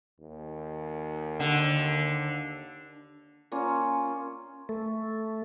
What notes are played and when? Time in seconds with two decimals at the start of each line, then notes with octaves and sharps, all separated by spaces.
0.20 D#2
1.40 D3
3.52 A#3 C#4 F4
4.69 A3